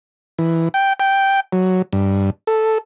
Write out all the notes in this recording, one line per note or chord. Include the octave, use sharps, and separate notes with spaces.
E3
G5
G5
F#3
G2
A4